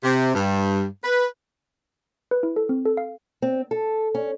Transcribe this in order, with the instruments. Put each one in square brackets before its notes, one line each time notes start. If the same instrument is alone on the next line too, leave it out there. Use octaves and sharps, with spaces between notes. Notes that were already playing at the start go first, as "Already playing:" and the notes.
[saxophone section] C3
G2
B4
[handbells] B4
E4
A4
C4
A4
F5
[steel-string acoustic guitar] C4
A4
C#4